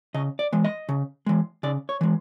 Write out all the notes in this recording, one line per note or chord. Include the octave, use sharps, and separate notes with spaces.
C#3 D#5
D5
E3 G#3
D#5
C#3
E3 G#3
C#3 D5
C#5
E3 G#3